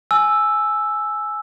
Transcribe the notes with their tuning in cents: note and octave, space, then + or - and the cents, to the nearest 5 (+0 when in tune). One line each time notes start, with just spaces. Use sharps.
G#5 +15 E6 +0